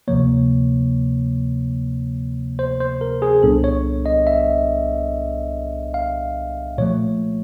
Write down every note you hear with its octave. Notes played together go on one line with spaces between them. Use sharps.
D2 C3 F3 A#3 C#5
C5
C5
A#4
G#4
C2 A#2 G3 B3 D4 A4
C#5
D#5
E5
F5
A#2 F3 A3 C#5